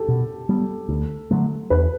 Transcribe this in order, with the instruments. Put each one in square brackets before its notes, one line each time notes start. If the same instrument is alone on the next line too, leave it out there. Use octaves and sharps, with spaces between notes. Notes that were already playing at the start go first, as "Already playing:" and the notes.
Already playing: [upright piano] G4 A4
[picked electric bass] B2
G3 B3
D2
D3 F#3 A3
[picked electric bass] E2 [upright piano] B4